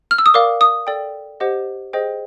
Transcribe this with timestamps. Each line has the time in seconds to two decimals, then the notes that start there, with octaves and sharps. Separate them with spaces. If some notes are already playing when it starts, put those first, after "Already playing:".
0.11 F6
0.18 E6
0.26 D#6
0.34 A#4 D5 F5 D6
0.61 D#6
0.87 A4 D5 G5
1.40 G4 C5 D#5 F#5
1.93 G#4 C5 D#5 G5